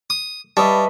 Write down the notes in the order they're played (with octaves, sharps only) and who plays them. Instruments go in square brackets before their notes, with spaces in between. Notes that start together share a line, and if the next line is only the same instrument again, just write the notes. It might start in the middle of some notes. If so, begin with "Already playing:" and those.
[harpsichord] D#6
[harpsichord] G3 [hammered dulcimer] B4 D#5 E5 [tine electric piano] A5 C#6